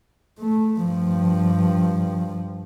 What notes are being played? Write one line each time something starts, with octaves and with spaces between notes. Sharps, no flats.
A3
G2 F3